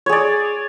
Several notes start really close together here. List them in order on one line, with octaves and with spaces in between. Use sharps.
C#5 G#4 D5